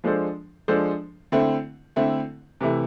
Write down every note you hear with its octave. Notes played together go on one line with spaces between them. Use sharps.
F3 G#3 D4 A4 C5
F3 G#3 D4 A4 C5
D3 A3 C4 E4
D3 A3 C4 E4
C3 E3 A3 E4